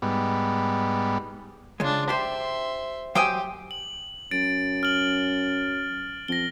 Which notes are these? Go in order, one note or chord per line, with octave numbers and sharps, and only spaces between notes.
G#2 G3 B3
C#3 G#3 D4 F4
G4 C5 E5 C6
F#3 G4 C5 G5 G#5 D#6 E6
F#7
F#2 A6 D7
F6 F#7
F2 A#6 G7